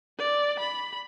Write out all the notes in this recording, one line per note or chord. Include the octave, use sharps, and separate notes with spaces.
D5
B5